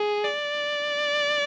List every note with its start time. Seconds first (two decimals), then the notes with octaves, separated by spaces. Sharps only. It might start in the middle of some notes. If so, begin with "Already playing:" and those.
Already playing: G#4
0.25 D5